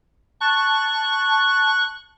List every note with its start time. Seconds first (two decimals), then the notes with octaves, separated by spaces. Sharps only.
0.41 A5 C#6 F#6